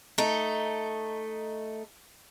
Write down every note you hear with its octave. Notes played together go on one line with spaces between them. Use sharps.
A3 D#4